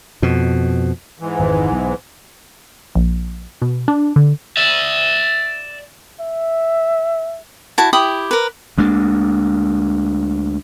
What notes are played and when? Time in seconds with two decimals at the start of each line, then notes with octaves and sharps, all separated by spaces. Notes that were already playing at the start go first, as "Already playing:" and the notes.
0.22 F2 B2
1.20 G#2 E3
1.39 G#1 F2
1.72 B1
2.95 A#1
3.62 B2
3.88 D4
4.16 D3
4.57 D5 E5
6.20 E5
7.78 E4 F#4 A5
7.93 E4 G4 B5 D#6
8.31 A#4 B4
8.78 D2 G#3 A#3 D4